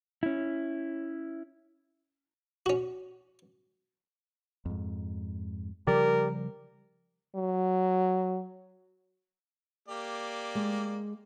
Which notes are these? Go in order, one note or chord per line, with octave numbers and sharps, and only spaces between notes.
C#4 E4
C#4 F#4
F2 G#2
C#3 F3 G3 G4 A#4 D5
F#3
A#3 G4 D5
G#3